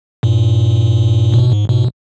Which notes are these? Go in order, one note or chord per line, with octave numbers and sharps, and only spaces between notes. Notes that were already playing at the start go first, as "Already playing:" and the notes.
G2 A#2
G#2 B2
G#2
G#2 B2